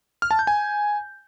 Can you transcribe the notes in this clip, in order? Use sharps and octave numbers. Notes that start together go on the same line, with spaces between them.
F6
A5
G6
G#5